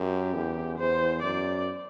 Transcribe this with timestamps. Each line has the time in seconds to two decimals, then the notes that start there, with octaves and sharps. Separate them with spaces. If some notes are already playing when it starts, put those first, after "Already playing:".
Already playing: F#2 G4
0.35 E2
0.78 E2 C5
1.22 F#2 D5